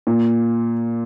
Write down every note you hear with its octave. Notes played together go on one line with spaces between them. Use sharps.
A#2